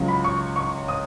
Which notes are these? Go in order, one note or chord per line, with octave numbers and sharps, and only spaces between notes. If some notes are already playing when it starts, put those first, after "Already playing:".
Already playing: C#2 C#3 F#3
B5
C#6
C#6
D#6